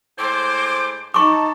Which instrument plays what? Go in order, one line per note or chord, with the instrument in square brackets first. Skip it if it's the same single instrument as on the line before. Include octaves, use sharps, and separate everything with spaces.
[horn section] A2 G#3 C5 [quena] D6
[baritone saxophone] D#4 [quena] A5 [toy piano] C#6 D6